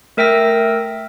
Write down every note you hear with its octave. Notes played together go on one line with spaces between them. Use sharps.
A3 A#4 E5 G5 E6 A#6